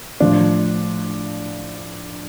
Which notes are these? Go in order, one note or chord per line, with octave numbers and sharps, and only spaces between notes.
A2 F3 D4